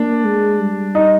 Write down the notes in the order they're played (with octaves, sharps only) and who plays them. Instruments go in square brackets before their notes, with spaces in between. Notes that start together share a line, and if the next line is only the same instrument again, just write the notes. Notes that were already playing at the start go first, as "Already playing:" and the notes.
Already playing: [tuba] A#3 [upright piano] D4
[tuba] G#3
G3
[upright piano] D#4